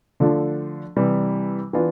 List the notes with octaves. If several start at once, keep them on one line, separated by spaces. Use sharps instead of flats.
D3 F3 A3 D4 F4
C3 E3 G3
E3 B3 D4 F4